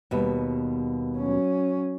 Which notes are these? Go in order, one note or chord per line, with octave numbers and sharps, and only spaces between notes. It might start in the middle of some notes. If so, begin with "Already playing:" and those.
D#2 B2 G3
F#3 C#4